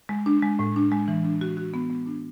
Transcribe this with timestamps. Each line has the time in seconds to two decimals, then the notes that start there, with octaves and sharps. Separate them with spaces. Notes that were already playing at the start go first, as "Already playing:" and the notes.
0.09 G#3
0.26 D4
0.42 G#3
0.59 A2
0.76 D4
0.92 G#3
1.08 E3
1.24 D4
1.41 F#4
1.57 F#4
1.74 B3
1.90 B3
2.06 D4